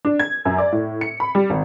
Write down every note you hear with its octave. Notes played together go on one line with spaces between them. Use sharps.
D4
G#6
F#2
D5
A2
C#7
B5
G3
G#1